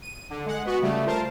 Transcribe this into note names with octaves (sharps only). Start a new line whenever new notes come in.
D#7
D3
G#3 F#5
B3 F#4
C#3 G3 A3
F4 A#4 C5 A5